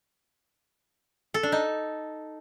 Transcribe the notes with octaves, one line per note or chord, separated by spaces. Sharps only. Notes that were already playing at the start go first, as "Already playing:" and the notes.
A4
D4
D#4